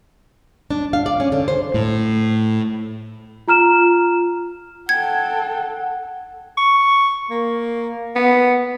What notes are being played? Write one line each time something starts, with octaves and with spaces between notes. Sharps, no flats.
D4
F5
D5
C#4
D3
C5
A2
F4 A#5 F6 E7
A4 F#5 G5 G#6
C#6
A#3
B3